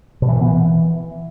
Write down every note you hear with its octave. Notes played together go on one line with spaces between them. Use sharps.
B2
E3
A#2
B3
E3